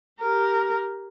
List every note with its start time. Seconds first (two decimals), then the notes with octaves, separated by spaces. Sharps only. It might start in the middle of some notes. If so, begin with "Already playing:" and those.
0.20 G4 A#4